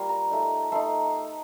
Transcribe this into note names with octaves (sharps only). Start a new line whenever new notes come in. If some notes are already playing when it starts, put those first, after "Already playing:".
Already playing: G3 A#3 F4 C6
A#5
A3 D#4
A3 D#4 C6